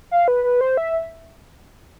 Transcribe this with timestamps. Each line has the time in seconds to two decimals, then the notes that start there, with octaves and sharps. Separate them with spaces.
0.11 F5
0.28 B4
0.44 B4
0.61 C5
0.77 E5